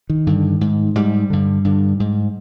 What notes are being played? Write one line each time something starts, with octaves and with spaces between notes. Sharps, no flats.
D#3
G2 D3
G#2
G#2 G3
G2 D3
G2 D3
G#2